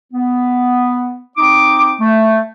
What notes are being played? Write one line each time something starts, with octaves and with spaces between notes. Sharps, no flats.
B3
C4 D#4 D6
A3